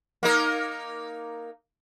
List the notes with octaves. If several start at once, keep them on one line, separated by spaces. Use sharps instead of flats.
A#3 D#4 A#4